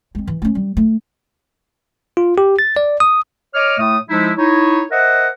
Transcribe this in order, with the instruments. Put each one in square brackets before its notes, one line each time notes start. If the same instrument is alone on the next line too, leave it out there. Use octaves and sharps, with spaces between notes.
[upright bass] G#3 C4
E3
A3 C#4
G3
A3
[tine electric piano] F4
G4
A6
D5
D#6
[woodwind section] C#5 D#5 D6 F6
A2 A3 D#6
F3 G#3 D#4 E4
D#4 E4 C#5
A#4 C5 D#5 E5 F#5